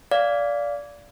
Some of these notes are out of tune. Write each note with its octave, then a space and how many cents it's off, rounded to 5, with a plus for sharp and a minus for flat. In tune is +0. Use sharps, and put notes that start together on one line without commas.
D5 -20 F5 +0